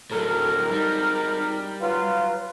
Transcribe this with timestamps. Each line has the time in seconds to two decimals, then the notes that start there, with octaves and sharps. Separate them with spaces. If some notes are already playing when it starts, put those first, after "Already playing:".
0.11 G#1 A2 F#3 A4 A#4
0.72 G3 D#4
1.80 F#3 F4 B4